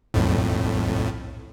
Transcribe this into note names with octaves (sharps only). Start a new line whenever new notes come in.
B1 F2 A2